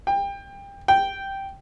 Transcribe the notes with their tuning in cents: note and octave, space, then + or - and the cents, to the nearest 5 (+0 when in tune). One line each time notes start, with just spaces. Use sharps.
G5 +25
G5 -5